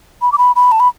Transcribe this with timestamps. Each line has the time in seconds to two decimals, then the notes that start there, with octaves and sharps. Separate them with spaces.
0.22 B5
0.32 D6
0.38 B5
0.56 B5
0.72 A5
0.80 B5